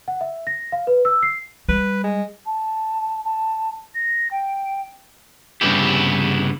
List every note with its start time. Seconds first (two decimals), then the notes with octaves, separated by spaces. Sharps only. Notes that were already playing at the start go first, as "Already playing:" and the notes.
0.08 F#5
0.21 E5
0.47 A#6
0.72 F5
0.87 B4
1.05 E6
1.23 C7
1.69 G3 B4
2.04 G#3
2.46 A5
3.24 A5
3.95 A#6
4.31 G5
5.61 C2 G2 C#3 B3 E4 G4